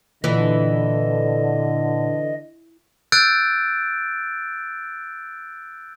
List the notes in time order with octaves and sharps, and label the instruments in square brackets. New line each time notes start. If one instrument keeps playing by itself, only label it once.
[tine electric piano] A#2 [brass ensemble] D3 [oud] E3 [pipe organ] D#5
[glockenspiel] E6 F#6 G6 A6 D7